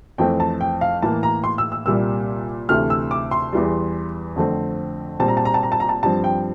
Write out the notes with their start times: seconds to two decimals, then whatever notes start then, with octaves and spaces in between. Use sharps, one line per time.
0.18 F2 E3 A3 C4 G5
0.40 A5
0.61 G5
0.81 F5
1.02 A2 E3 A#3 A5
1.23 A#5
1.44 C6
1.58 E6
1.72 E6
1.86 C2 A#2 G3 A#3 E6
2.69 D2 C3 E3 A3 F6
2.90 E6
3.11 D6
3.31 C6
3.52 E2 E3 G3
4.36 F2 D3 A3 C4
5.19 A#2 G3 C4 A5
5.28 A#5
5.37 A5
5.45 A#5
5.54 A5
5.63 A#5
5.72 A5
5.80 A#5
5.89 A5
6.03 G2 F3 C4 A5
6.24 G5